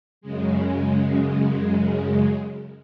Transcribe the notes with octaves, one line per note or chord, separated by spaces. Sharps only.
F#2 C#3 G#3